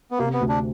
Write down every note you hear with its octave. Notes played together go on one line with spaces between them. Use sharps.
B3
C3 A#3
B3
D2
D4